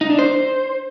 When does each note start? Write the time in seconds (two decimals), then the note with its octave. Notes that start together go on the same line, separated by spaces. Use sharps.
0.01 D#4
0.10 D4
0.19 C5